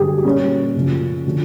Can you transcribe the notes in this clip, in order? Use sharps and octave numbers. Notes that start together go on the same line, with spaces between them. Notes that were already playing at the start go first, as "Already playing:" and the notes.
Already playing: G2 D3 F#3 G4 G#4
A#2 G3 A#3 C#4
F#2 C#3 F3
D3 F3